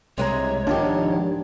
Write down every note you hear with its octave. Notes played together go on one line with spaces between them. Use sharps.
C2 C3 G#3 C#5 A#5
G#2 D#3 F3 D4 G4